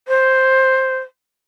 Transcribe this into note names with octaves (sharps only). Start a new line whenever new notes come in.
C5